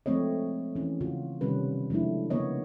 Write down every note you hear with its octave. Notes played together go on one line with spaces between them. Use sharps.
F3 G#3 A3 C4 C#5 D#5
E3 C#4
C#3 F4 F#4
C3 D#3 G3 C#4 B4
F3 G#3 A3 D4 E4
C#3 A#3 B3 C#5 D#5